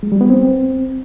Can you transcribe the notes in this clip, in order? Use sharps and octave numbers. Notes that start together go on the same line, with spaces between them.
G#3
G3
B3
C4